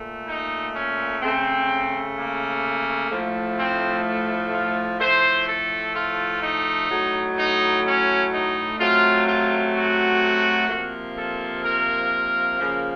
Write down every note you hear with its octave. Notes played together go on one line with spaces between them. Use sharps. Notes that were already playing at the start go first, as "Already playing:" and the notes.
Already playing: A#2 A3
D#4
C#4
C#3 A3 C4
A#3
A2 F3 A3
C4
F4
A2 F3 A3 C5
A4
F4
D#4
A2 F#3 A3
D#4
C#4
D#4
C3 F#3 A3 F4
F4
F#4
C3 F3 A#3
A4
A#4
C#3 F3 A#3